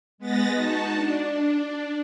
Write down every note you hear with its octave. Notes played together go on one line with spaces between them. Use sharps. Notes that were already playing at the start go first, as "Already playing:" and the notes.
G#3 B3 B4 A6 A#6
D#4 F#4 A5
D4